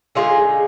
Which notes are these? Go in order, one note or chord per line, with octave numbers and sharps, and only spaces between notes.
D3 G#3 D#4 F4 G#4